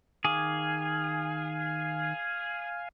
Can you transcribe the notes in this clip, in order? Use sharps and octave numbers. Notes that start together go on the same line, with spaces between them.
D#3 G#4 F5 G#5 D6